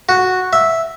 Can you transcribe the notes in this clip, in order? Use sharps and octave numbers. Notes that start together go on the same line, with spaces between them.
F#4
E5